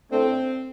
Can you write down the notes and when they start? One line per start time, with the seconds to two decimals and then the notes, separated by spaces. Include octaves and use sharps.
0.11 A2 A3 C4 D4 A4